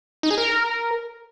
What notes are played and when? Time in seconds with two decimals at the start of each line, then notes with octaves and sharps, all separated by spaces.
0.23 D#4
0.30 G#4
0.38 A#4